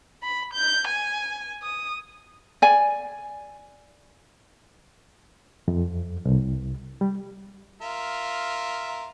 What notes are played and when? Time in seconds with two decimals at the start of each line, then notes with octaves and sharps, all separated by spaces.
0.23 B5
0.54 G6
0.87 G#5
1.63 D#6
2.62 D5 G#5
5.68 F2
6.25 C2
7.01 G3
7.82 F4 A#4 E5